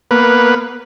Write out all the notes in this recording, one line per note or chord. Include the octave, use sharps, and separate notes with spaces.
A#3 B3 B4